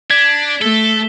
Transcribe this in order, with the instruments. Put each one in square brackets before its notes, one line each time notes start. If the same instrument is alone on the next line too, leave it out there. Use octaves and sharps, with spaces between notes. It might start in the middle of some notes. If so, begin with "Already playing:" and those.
[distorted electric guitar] D4 [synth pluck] G#6 [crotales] B6
[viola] A3 [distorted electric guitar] A4 [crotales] G7